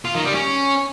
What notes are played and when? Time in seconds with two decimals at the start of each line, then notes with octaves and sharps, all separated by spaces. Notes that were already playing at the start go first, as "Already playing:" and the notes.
0.05 F4
0.15 D#3
0.24 G3
0.34 C#4